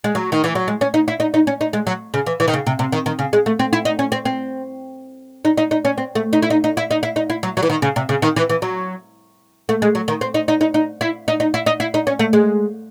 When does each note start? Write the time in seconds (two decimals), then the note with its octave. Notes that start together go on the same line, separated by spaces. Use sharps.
0.04 G#3
0.15 F#3
0.32 D#3
0.44 E3
0.55 F#3
0.68 G#3
0.81 C#4
0.94 D#4
1.08 E4
1.20 D#4
1.34 D#4
1.47 C#4
1.61 D#4
1.73 G#3
1.87 F#3
2.14 C#3
2.26 E3
2.40 E3
2.48 D#3
2.53 C#3
2.67 C3
2.79 C3
2.92 D#3
3.06 D#3
3.19 C#3
3.33 G#3
3.46 A3
3.59 C4
3.73 E4
3.85 D#4
3.99 C#4
4.12 C4
4.25 C4
5.45 D#4
5.57 D#4
5.71 D#4
5.85 C#4
5.98 C4
6.15 A3
6.33 D#4
6.42 E4
6.50 D#4
6.64 D#4
6.77 E4
6.91 D#4
7.03 E4
7.16 D#4
7.30 E4
7.43 F#3
7.57 F#3
7.63 E3
7.70 D#3
7.82 C#3
7.96 C3
8.09 C#3
8.22 D#3
8.36 E3
8.50 E3
8.62 F#3
9.69 A3
9.82 G#3
9.95 F#3
10.08 D#3
10.21 C4
10.34 D#4
10.48 D#4
10.61 D#4
10.74 D#4
11.01 E4
11.28 D#4
11.40 D#4
11.54 E4
11.66 D#4
11.80 E4
11.94 D#4
12.07 C#4
12.19 A3
12.33 G#3